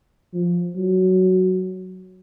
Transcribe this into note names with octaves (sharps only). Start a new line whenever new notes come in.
F3
F#3